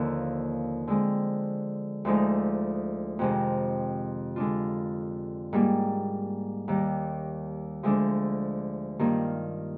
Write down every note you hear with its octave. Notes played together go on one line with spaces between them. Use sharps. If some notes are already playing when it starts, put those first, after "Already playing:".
Already playing: D#2 D3 F3 A#3
D3 G#3 C4
D2 D3 F3 G#3 D#4
F2 C3 D#3 G#3
D3 G#3 D4 F4
G#2 G3 A#3
D#2 D#3 G3
D2 D3 F3 G#3 D4
G2 D#3 A#3 F4